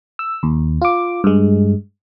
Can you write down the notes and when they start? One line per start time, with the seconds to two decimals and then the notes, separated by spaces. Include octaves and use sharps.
0.19 E6
0.43 D#2
0.82 F4 D6
1.24 G2 G#3